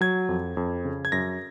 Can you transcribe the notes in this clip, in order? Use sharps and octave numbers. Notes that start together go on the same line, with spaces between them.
F#3 G#6
F2
F2
C#3
G#6
F#2 A#6